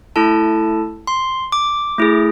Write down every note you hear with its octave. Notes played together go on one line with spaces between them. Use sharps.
A3 E4 A4 A5
C6
D6
A3 E4 G#4